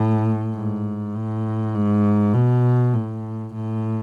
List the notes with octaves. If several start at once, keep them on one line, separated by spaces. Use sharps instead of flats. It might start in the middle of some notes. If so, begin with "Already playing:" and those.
Already playing: A2
G#2
A2
G#2
B2
A2
A2